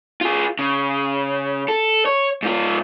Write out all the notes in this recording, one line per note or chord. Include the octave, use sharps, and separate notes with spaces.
F4 G#4
C#3
A4
C#5
G#2 F4